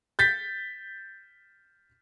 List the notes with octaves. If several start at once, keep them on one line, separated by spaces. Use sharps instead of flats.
G6 A6 B6